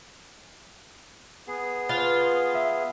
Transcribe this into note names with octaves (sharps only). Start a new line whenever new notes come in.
B3 G#4
F4 B4
E5